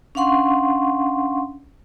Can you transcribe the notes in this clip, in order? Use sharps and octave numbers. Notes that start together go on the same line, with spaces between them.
C#4 D4 F5 F#5 C6 C#6